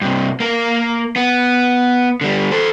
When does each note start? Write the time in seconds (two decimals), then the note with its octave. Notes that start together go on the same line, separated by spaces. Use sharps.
0.01 G2 C3
0.40 A#3 A#4
1.16 B3
2.21 D3 G3
2.51 A4 C5